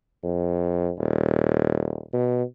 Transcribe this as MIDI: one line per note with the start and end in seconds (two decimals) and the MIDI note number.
0.23 0.90 41
0.98 2.03 27
2.13 2.43 47